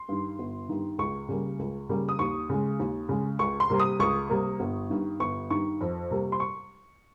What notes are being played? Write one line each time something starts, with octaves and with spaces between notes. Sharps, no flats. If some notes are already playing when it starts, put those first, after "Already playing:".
Already playing: C6
G2 D#3
G1
G2 D#3
C#2 C#6
C#3 G3 A#3
C#2
C#3 G3 A#3
D#6
D#2 C#6
C#3 G#3
D#2
C#3 G#3
C#2 C#6
C6
C3 G3 A#3
D#6
C#2 C#6
C3 G3 A#3
G1
G2 D#3
G1 C#6
G2 D#3 C#6
F2
C3 G3 A#3
C6
C#6